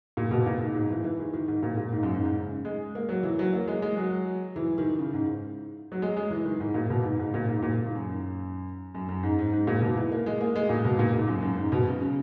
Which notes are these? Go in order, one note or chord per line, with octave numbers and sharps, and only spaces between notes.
A#2
B2
A#2
G#2
G#2
E3
E3
D#3
D#3
G#2
A#2
A#2
G#2
F#2
G#2
G#2
C#3
G#3
A#3
F#3
E3
F#3
A#3
G#3
G#3
F#3
E3
D#3
C#3
G#2
F#3
G#3
G#3
E3
D#3
G#2
A#2
B2
G#2
G#2
A#2
G#2
A#2
D#3
F#2
F#2
F#2
G#2
G#2
G#2
A#2
B2
E3
A#3
G#3
A#3
G#3
A#2
B2
A#2
G#2
F#2
F#2
G#2
B2
C#3
C#3